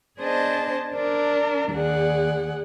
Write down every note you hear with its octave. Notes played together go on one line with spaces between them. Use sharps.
B3 D4 G#4 C5 D#5 A5
D4 A#4
D#2 G#4 D5 F#5